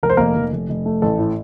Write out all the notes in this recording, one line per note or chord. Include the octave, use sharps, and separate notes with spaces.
F1 A#4
C5
F1 A#3 A#4
F1
F1
F1
A3
A1 A4
A2